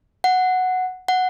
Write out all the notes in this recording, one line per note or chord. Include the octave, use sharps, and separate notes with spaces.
F#5
F#5